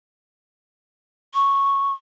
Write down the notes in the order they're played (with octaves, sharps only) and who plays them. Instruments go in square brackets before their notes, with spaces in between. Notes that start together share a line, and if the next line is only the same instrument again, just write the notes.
[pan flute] C#6